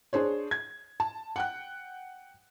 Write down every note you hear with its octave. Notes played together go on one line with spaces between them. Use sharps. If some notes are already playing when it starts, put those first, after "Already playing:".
D4 G#4 C5 C#5
G#6
A5
F#5 G5 F#6